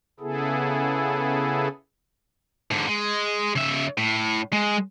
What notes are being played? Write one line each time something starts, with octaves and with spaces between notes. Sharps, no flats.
C#3 B3 E4 G#4 A4
G#2 D3
G#3
C#3 E5
A2
G#3